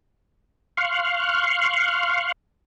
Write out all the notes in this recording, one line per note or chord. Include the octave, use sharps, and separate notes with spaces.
F5 C6 C#6 F6 F#6